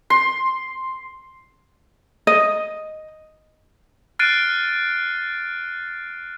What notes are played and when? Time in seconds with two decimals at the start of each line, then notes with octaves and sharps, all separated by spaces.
0.10 C6
2.27 D#5
4.19 F6 F#6 A6 C7 D7 D#7